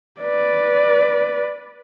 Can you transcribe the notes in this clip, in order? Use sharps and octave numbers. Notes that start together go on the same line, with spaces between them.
B4 D5